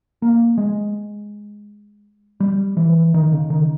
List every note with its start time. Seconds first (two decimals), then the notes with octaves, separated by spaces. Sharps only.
0.22 A#3
0.58 G#3
2.40 G3
2.77 E3
3.14 D#3
3.32 C#3
3.50 D#3